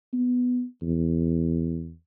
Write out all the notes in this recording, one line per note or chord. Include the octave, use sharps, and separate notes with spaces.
B3
E2